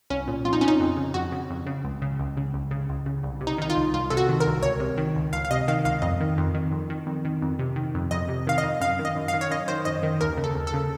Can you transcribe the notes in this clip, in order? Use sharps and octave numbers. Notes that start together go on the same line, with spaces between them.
C2 C#4
A#2
F2 F4
D#4
C#3 C#4
D#4
F2
C#3
F2 F#4
C#3
F2
C#3
C#2
C#3
C#2
C#3
C#2
C#3
C#2
C#3
C2
C3
D#4
D#3 D#4
F4
C2
C2 F4
C3 A4
F#4
D#3
A#4
C2
C#2 C#5
C3
D#3
C#2
C#2 F5
F5
C3 D#5
D#3 F5
C#2 F5
F2 D#5
D#3
F2
D#3
F2
D#3
F2
D#3
F2
C3
D#3
F2
F2 D#5
C3
D#3 F5
D#5
F2
F#2 F5
D#3
D#5
F#2
F5
D#3
C#5
F#2 D#5
D#3 C5
F#2 D#5
D#3
D#2 A#4
C#3
A4
D#2
A4
C#3